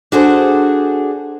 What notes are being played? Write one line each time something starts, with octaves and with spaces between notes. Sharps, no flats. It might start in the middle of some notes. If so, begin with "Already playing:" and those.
D4 F#4 G#4 A4 C5